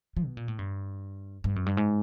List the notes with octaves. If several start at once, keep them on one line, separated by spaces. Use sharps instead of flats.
F3
B2
A#2
A2
G2
G2
F#2
G2
G#2